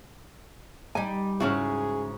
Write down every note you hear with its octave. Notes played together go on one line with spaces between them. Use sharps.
G3 D#4 G#5
G#2 C#3 C#4 D4 E4 F#4 G#4